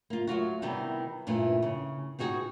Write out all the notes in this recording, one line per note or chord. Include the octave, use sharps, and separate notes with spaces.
A#3 F4
F#3 A3 F4 F#4
C3 D#3 E3 G3 B3
G2 A#2 E3 A3
C#3
C4 D#4 F#4 G#4